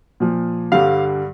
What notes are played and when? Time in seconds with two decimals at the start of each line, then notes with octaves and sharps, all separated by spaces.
0.20 A#2 F3
0.72 G2 D3 G3 F5